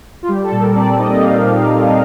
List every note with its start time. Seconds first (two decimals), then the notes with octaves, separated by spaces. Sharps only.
0.23 F4
0.28 G3 G4
0.43 A4
0.52 A#2
0.60 A#4
0.75 C4 D5
0.98 D#4 D#5
1.13 D#5
1.22 G3 F5
1.45 A#2